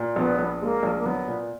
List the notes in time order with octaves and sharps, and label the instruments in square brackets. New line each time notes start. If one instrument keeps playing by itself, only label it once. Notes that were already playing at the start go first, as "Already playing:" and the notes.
Already playing: [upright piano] A#2
[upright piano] A#1 [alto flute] B3
[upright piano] A#1
[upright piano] G#3 [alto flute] A#3
[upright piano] A#1
[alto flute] A#3
[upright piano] F#3 [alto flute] B3
[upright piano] A#2